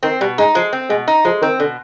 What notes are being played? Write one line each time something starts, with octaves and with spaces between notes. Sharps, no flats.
D#3 C4
B2 G3
G#3 D#4
F3 G#3
C4
B2 G#3
D#4
F3 G#3
D#3 C4
B2 D3